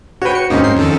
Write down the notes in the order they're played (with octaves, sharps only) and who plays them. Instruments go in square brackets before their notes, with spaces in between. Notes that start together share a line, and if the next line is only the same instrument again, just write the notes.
[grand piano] F#4 B4 [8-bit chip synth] C#5 G5
[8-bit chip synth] C#7
[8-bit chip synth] D#2 G#2 A#3 [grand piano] C4 C#4 D#4
[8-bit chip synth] G#2 C7
F2 D#3 A4